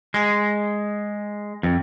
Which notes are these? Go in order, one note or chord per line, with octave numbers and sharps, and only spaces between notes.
G#3
F2